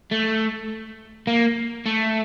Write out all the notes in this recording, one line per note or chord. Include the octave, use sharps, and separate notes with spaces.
A3
A#3
A3